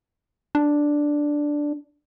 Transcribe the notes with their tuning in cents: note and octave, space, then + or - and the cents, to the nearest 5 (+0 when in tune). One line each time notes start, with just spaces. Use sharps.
D4 +0